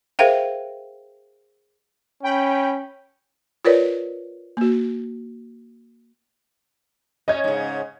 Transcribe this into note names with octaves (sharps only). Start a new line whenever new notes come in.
G#4 A#4 C5 E5 F5 G5
C#4 G5 B5
F4 A#4 B4 C#5 D5
A#3 F#4
C#4 D#5 G#6
G#2 C#3